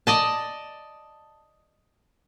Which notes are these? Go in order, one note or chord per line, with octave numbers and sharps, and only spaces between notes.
D5 D#5 A5